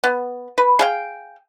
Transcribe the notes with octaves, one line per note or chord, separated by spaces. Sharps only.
B3
B4
G#4 F5 G5